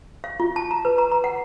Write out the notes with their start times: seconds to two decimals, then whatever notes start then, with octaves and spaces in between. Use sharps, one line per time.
0.24 F5
0.40 F4
0.56 A5
0.71 A#5
0.85 B4
0.98 A#5
1.12 A#5
1.24 F#5